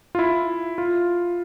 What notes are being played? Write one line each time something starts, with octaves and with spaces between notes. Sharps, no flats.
F4
E4
F4